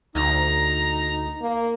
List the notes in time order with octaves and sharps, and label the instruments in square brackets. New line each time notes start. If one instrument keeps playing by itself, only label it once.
[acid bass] D2 [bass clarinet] D#4 [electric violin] A#5
[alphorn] A#3